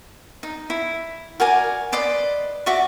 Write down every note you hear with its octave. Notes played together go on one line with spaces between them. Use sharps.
D#4
E4
F#4 A#4 D5 G#5
B4 D5 D#5 C6
F#4 D5 E5 C#6